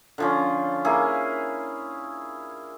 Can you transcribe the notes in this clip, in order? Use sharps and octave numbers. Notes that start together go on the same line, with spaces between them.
D3 F3 C#4
A#3 E4 G#4